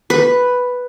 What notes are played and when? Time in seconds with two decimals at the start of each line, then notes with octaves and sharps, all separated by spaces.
0.10 B4